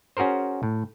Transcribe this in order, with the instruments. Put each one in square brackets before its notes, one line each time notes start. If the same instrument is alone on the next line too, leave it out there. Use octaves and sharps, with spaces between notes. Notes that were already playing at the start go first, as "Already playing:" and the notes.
[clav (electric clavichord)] C#4 F#4 G#4 A#4 C5
A2